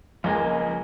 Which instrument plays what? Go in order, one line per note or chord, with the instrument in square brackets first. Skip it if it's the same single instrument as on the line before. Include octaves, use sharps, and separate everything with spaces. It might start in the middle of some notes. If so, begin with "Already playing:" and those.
[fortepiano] C#2 G#3 A#3 [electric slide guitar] F3 D#5 G#5